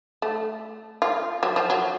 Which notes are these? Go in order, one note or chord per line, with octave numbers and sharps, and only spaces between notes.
A3
F4
F#3
F3
F#3